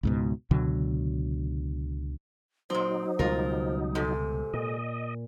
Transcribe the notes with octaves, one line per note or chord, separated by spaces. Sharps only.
C#2 G#2 B2
C#2 B2 D3 F#3
A#2 F#3 C4 D#4 C5
C#2 B2 G3 F4 A#4
G#2 C3 A4
A#2 D#5